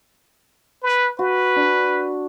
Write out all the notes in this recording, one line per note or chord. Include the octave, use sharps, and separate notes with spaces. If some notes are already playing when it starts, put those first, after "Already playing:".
B4
F#4 B4
D4